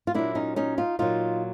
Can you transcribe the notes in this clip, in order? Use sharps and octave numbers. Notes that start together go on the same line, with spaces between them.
F4
A#2 F#3 D4 E4
C#4 D#4
C#4 D#4
D#4 F4
A#2 F#3 D#4 F4